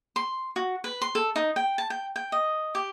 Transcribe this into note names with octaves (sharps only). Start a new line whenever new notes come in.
C6
F#4
B4
C6
A4
D#4
G5
A5
G5
G5
D#5
G4